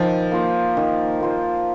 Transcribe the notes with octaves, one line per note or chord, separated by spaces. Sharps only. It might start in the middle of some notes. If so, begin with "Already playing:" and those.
Already playing: D#3 F3
A#3 F4 C5
D#3
A#3 F4 C5